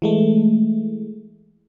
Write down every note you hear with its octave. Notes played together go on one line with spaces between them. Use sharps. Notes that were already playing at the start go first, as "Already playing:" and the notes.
E3 G#3 A3